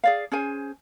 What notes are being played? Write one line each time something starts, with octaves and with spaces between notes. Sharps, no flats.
G#4 D5 F5
C#4 G#4 C5 G#5